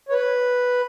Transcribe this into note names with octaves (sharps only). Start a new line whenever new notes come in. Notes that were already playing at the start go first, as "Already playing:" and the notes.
C#5
B4